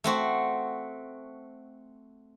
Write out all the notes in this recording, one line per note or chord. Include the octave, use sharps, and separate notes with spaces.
A3 C4 F#4